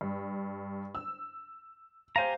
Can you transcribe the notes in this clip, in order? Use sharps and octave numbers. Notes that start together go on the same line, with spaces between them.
G2
E6
G4 C5 F5 G#5 A#5